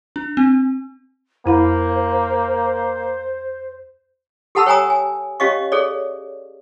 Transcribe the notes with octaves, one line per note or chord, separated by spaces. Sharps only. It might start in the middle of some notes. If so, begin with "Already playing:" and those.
D4
C4
F2 A#3 E4 C5 B5
G4 A4 F#5 A5 B5 E6
C#5 G5 G#5 A#5 D#6
G#5
C#4 G4 C#5 D#5 F5 C#6
G#4 A4 C#5 D5